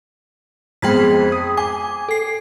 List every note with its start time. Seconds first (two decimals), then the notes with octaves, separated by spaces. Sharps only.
0.82 F2 G#3 B3 G5 G#6 B6
1.32 D#6
1.57 G#5 D6
2.09 A4 C7